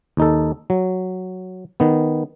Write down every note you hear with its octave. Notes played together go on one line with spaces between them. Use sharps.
D#2 D#4 A4
F#3
D#3 B3